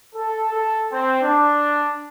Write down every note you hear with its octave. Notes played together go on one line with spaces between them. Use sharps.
A4
A4
C4
D4